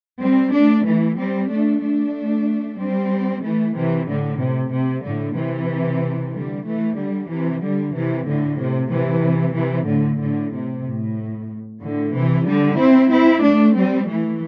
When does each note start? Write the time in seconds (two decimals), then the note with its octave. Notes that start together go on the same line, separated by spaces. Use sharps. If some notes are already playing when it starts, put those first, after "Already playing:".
0.20 G3 C4
0.52 A3 D4
0.85 E3 A3
1.16 G3 C4
1.49 A3 D4
1.81 A3 D4
2.78 G3 C4
3.42 E3 A3
3.74 C3 E3
4.07 A2 D3
4.40 C3
4.72 C3
5.03 A2 D3
5.36 C3 E3
6.33 D3 G3
6.65 E3 A3
6.97 D3 G3
7.30 C3 E3
7.62 D3 G3
7.95 C3 E3
8.27 A2 D3
8.59 C3
8.91 C3 E3
9.55 C3 E3
9.87 A2 D3
10.20 A2 D3
10.52 C3
10.85 A2
11.81 A2 D3
12.13 C3 E3
12.46 D3 G3
12.78 C4 E4
13.10 C4 E4
13.42 A3 D4
13.75 G3 C4
14.07 E3 A3